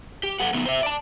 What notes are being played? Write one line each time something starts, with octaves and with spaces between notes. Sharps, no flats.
G4
A4 B4 F#5
D3 A3 B3 D#4
C5 E5
D5 A5